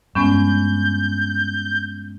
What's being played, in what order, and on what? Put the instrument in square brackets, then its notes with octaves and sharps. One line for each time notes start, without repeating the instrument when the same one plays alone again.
[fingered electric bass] G2 [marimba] G#3 B3 C#4 [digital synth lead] G6